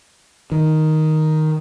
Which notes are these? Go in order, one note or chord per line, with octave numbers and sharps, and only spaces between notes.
D#3